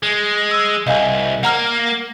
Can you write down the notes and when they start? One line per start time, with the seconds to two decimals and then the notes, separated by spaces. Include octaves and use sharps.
0.03 G#3
0.51 E6
0.87 C2 D#5 F5 G#5
1.43 A#3 F#5 A#5 F6